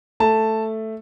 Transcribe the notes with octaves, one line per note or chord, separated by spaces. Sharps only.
A3 A5